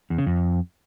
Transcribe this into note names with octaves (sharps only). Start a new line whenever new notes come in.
E2
C#3
F2